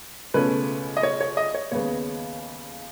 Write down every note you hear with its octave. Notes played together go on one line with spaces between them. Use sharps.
C#2 B2 A3 C#4 B4
D#5
C#5
C#5
D#5
C#5
D#2 C#3 G#3 B3 C#5